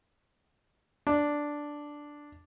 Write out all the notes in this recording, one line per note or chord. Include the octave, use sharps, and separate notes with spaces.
D4